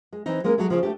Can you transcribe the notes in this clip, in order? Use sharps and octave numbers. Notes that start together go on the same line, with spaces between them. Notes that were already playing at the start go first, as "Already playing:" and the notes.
G#3
E3 C4 D#4
G#3 A#3 C#4 A#4
F#3 G#3 A3
C#3 F3
A3 D4 G4